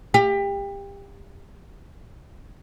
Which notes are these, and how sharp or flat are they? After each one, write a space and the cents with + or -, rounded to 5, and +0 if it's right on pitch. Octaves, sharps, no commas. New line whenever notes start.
G4 +25